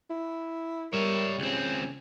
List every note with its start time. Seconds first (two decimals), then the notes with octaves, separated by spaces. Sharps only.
0.10 E4
0.93 G3 A#4 C#5 E5
1.39 C#2 C#3 C4 G#5